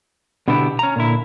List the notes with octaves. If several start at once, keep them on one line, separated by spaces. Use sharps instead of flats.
B2 D3 B3 D4 E4 G4
C#4 A#5
A#2 D3 E4